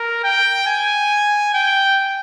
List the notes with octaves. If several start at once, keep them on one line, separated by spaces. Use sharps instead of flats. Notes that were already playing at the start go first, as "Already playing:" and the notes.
Already playing: A#4
G5
G#5
G5